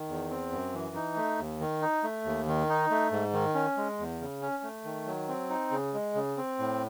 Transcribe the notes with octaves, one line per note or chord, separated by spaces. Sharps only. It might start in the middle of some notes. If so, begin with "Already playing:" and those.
Already playing: D#3
E2
C4
F#2
E3
D#4
A3
D#2
D#3
D#4
A3
D#2
D#3
D#4
A3
G#2
D#3
C#4
G#3
E2
C#3
C#4
A3
D#3
F#3
C4
D#4
C#3
G#3
C#3
C4
A2